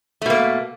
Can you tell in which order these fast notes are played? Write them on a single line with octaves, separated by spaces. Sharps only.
A3 B2 A#3